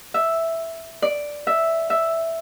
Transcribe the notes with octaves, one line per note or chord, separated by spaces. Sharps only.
E5
D5
E5
E5